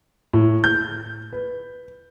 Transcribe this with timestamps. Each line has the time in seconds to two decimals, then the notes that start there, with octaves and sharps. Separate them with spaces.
0.33 A2
0.64 G6
1.33 B4